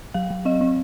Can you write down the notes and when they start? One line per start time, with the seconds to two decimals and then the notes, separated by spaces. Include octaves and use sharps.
0.14 F#3 F5
0.30 F#3
0.45 C4 D#5
0.61 C4